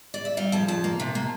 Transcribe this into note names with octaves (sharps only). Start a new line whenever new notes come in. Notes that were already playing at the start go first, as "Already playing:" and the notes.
D5
E5
G3 F5
F2 A5
F2 A5
A#3
C3
A#3